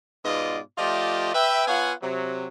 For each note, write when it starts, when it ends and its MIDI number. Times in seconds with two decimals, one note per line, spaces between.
0.25 0.59 44
0.25 0.59 47
0.25 0.59 59
0.25 0.59 65
0.25 0.59 74
0.25 0.59 75
0.78 1.31 53
0.78 1.31 57
0.78 1.31 65
0.78 1.31 67
0.78 1.31 74
0.78 1.31 75
1.34 1.66 71
1.34 1.66 76
1.34 1.66 79
1.67 1.92 59
1.67 1.92 65
1.67 1.92 73
1.67 1.92 77
1.67 1.92 78
1.67 1.92 80
2.02 2.46 48
2.02 2.46 54